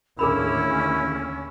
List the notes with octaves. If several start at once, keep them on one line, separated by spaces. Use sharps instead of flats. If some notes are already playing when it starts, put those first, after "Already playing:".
D#2 A2 D3 C#4 E4 G#4 A#4 B5